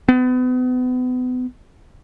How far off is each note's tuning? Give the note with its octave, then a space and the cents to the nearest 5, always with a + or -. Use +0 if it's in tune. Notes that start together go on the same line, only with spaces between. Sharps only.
B3 +35